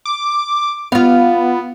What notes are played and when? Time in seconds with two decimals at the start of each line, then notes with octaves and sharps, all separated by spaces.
0.05 D6
0.92 B3 F4 F5